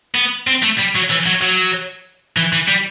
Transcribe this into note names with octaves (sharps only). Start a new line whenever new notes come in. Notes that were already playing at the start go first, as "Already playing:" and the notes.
B3
C4
A3
G3
F#3
E3
F#3
F#3
E3
E3
G3